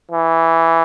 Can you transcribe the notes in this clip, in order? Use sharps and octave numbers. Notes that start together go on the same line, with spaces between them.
E3